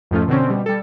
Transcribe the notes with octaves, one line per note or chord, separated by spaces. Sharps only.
F2 G#2 F3 A3 C#4 F4
B2 D3 C4 C#4
B2 G3
G3 A4